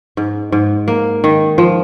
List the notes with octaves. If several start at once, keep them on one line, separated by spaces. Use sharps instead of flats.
G#2
G#2
A#3
D#3
F3